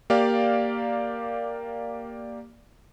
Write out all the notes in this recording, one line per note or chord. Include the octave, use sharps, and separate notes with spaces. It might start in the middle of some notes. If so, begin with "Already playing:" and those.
A#3 G4 D5 F5